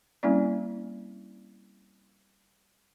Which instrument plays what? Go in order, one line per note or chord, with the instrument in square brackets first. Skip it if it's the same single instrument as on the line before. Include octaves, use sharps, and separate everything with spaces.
[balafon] G3 A#3 C4 C#4 E4 D5